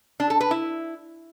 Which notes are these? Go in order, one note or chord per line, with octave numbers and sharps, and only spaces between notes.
D4
A4
B4
E4